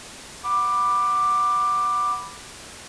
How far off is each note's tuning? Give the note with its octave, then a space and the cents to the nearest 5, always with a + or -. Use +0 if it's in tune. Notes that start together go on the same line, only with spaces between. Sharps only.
F#5 +0 B5 +0 D6 +10